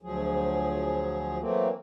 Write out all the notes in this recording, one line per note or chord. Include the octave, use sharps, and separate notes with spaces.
D2 F3 F#3 G#4
E3 F#3 A3 A#3 C4